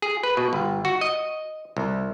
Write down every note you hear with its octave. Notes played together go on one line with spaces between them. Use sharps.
G#4
B4
B2
G1
F#4
D#5
C2